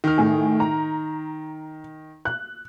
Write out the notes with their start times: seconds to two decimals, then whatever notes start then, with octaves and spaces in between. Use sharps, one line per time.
0.04 D#3 F6
0.18 A2 G#4
0.60 A#5
2.25 F#6